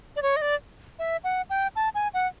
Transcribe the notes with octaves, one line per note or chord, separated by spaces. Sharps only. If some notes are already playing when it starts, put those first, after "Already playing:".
D5
C#5
D#5
D5
E5
F#5
G5
A5
G#5
F#5